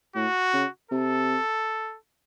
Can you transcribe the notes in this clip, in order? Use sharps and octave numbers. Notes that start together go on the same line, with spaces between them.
A2 F#4
C#3
C3 A4